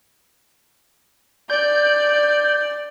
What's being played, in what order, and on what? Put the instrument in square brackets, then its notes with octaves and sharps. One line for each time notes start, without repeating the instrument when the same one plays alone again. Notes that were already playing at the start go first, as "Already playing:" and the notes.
[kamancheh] D5 [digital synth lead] G6